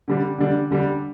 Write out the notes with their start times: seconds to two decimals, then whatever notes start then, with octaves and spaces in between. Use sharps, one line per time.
0.08 D3 G3 D4
0.38 D3 G3 D4
0.71 D3 G3 D4